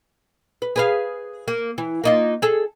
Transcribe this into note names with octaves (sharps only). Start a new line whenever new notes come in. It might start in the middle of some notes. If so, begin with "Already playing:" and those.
B4
G#4 B4 F5
A#3
E3
A#3 D#4 F4
G#4 A4